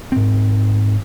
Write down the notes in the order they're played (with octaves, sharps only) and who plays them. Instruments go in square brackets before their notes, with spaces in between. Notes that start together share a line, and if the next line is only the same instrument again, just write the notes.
[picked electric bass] G#2 C4